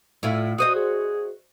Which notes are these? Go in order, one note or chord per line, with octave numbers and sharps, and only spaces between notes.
A2 E4 F4
F#4 C5 D#5 D#6
G#4